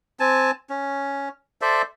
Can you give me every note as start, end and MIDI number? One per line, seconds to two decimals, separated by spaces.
0.20 0.51 60
0.20 0.51 80
0.20 0.51 81
0.70 1.29 61
1.61 1.82 69
1.61 1.82 72
1.61 1.82 74
1.61 1.82 76